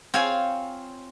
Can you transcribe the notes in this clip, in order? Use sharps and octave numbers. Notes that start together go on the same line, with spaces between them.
C4 F4 C#5 F5 G#5